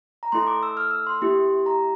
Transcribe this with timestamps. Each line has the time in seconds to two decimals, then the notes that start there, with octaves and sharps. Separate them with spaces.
0.23 A#5
0.32 A3 E4 A4 C6
0.47 D6
0.63 E6
0.77 F6
0.91 E6
1.07 C6
1.22 A#3 E4 G4
1.66 A#5